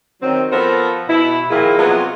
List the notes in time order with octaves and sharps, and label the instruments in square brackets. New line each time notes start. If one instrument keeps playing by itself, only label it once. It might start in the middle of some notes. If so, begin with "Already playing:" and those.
[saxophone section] D#3 F#3 C4
F3 B3 A4 A#4 C5
B2 E4
A#2 D#3 F3 A#3 E4 G#4
C3 F#3 G#3 B3 F4 G#4